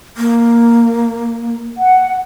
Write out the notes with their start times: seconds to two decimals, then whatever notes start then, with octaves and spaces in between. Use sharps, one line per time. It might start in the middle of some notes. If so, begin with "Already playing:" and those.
0.17 A#3
1.78 F#5